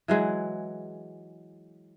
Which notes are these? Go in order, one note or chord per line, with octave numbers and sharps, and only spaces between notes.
E3 F#3 G#3